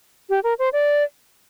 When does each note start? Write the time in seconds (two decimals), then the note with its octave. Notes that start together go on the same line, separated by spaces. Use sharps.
0.29 G4
0.44 A#4
0.59 C5
0.73 D5